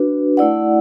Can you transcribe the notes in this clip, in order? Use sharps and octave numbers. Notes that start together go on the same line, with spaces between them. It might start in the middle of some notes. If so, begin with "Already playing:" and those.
Already playing: D4 F#4 B4
A3 E4 D5 F#5